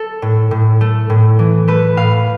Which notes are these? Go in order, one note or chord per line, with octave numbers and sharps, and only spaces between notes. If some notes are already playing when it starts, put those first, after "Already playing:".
Already playing: A4
A2
A2
A3
A2
E3
A3 B4
A2 F5